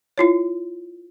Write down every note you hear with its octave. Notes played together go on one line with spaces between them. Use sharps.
E4 F4 C#5